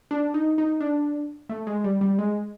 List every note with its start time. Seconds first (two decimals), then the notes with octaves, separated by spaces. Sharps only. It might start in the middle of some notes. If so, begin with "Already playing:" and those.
0.11 D4
0.34 D#4
0.58 D#4
0.80 D4
1.49 A3
1.67 G#3
1.84 G3
2.01 G3
2.19 G#3